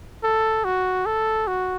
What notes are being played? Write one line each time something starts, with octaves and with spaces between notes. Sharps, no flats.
A4
F#4
A4
F#4